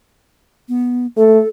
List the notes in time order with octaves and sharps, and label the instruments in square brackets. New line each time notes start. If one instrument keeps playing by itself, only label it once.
[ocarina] B3
[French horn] A3 [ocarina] A4